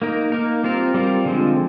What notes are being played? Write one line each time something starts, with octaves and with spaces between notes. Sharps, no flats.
A#3 D#4 A#4
A#3 D#4 A#4
G3 C4 F4 A#4
G3 C4 F4 A#4
D3 F3 G#3 C4